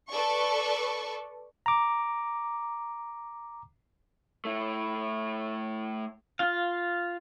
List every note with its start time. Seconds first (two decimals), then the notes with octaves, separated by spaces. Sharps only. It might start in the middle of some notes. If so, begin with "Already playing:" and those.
0.11 A4 B4 D5 C#6
1.66 A#5 D6
4.45 A3 E4
6.39 F4 F5